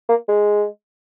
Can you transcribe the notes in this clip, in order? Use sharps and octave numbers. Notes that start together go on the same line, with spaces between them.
A#3
G#3